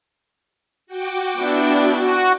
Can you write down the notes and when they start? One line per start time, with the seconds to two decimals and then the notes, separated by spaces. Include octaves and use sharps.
0.87 F#4 G5 D6
1.39 B3 D4 E4
1.94 F#4